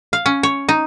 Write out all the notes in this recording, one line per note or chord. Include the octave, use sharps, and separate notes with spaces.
F5
C#4
C#5
D#4